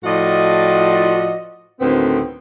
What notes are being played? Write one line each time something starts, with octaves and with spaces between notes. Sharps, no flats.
A2 F3 F4 F#4 D5 D#5
D2 A2 D#3 B3 C4